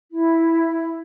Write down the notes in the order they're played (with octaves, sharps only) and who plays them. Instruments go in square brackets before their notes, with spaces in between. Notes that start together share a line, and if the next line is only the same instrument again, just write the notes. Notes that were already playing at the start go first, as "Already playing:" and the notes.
[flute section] E4